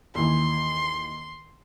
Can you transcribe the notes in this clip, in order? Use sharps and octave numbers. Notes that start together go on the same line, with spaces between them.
D#2 E3 C6